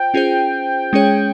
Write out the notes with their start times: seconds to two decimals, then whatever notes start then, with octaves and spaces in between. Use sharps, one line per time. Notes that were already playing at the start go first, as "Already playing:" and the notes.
Already playing: F4 C5 G5
0.14 C#4 F4 G#4 C5
0.93 G#3 C#4 G#4 C#5